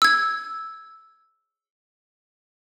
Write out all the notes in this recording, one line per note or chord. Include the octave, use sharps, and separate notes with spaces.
E6 G#6